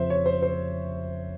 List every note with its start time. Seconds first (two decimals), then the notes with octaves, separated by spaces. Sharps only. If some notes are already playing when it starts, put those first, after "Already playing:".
Already playing: F2 C#3 F3 C5 E5
0.10 C#5
0.26 C5
0.43 C5